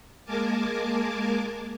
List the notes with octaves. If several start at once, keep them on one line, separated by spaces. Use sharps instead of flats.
G#3 A#3 A#4 G#5 A5 D6